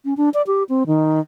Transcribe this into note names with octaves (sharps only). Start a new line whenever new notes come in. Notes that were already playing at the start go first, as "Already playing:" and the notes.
C#4
D4
D5
G4
C4
D#3